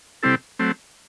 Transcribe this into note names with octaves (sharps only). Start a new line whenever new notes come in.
C3 G3 C4 E4 A4
F#3 A3 C4